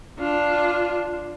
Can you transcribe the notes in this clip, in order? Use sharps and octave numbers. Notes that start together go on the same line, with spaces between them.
D4 F4